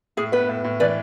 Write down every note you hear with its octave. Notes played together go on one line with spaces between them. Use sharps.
A2 G#4
B3 B4
A2
A2
E3 B4 D5